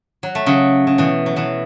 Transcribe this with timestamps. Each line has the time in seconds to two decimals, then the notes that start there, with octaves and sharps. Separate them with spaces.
0.23 F#3
0.35 A3
0.46 C#3 F#3
0.87 C#3
0.98 B2 E3
1.26 F#3
1.36 B2 E3